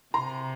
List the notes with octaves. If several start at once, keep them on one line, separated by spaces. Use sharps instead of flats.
C3 A#5 C6